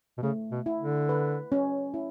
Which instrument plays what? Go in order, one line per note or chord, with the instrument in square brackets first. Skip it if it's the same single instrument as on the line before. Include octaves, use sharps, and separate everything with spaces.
[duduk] B2
[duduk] C#3 [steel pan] A3
[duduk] B2
[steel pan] E4
[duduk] D3
[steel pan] B4
C#4
E4